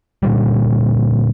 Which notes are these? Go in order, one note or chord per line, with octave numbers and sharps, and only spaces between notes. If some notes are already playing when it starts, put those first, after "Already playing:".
A#2 D3 G3